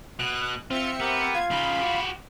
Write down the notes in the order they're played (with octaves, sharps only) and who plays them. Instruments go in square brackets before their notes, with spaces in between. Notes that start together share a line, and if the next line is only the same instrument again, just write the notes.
[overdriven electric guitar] B2 [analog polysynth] F#6
[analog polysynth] C4 E5 C#7 [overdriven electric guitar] F4
[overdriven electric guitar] B3 [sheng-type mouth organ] G4 A#4
[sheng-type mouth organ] F4 F5 [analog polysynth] G#6
[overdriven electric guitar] C#3 D#4 [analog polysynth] B5
[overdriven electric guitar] F#4 G4